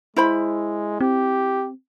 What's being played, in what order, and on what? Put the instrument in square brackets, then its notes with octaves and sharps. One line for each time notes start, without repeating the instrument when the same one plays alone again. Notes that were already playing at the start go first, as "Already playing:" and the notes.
[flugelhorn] G#3 [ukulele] E4 C5 B5
[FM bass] C4 [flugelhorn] G4